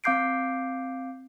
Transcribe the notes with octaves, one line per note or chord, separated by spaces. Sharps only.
C4 F5 D6 G6 C7 D7